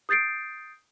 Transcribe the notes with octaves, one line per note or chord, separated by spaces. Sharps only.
D#6 G6 A6 C7 D7